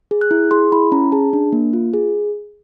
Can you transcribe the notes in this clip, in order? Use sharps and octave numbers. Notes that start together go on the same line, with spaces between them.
G#4
F#6
E4
G#4 C6
E4 B5
C#4 A#5
G#4 A5
D4
A#3
F4
G#4